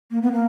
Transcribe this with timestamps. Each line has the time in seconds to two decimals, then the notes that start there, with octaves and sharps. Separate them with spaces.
0.11 A#3
0.22 B3
0.33 A#3